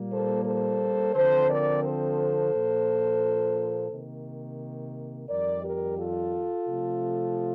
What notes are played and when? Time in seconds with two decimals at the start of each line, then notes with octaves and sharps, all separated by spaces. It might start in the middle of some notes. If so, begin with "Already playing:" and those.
Already playing: A#2 G3 A#3
0.10 A4 C5
0.44 A4 C5
1.13 D3 F3 C4 A4 C5
1.49 A#4 D5
1.83 A4 C5
2.53 A#2 F3 A#3
3.91 C3 D#3 A#3
5.29 F2 D#3 G3 A#4 D5
5.64 G4 A#4
5.98 F4 A4
6.68 C3 F3 A3